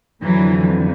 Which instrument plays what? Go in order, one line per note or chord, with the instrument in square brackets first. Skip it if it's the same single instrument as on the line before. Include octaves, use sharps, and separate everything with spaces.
[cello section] F2 D3 E3 F#3